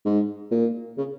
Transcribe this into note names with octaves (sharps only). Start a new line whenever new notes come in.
G#2
A#2
C#3